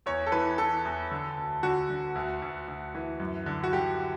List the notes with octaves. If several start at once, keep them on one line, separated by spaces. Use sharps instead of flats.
E2 C#5
A4
E3 B4
E3 A4
E2
D3
D2
D3 F#4
D3
D2
D2
D2
E3
F#2
D3
F#4
D3 G4